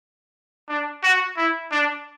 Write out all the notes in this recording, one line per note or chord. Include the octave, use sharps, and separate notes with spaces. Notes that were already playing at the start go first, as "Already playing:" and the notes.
D4
F#4
E4
D4